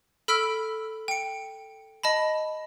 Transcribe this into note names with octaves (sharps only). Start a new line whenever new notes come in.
A4 B5 E6 F6 B6 D7
G5 C#7
D#5 A5 B5